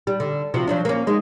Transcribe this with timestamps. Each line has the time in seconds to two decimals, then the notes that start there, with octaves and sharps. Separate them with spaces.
0.07 G3
0.20 D3
0.54 C3 F3 F#4
0.68 F3 F#3 D4
0.85 A#3 C#4
1.07 G#3 D#4